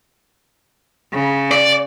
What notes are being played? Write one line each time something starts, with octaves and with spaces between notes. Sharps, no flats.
C#3
D5